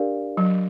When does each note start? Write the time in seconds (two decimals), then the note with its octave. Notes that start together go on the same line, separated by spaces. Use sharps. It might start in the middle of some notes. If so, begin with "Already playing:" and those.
Already playing: D4 G4 A#4 D5 F5
0.37 F#3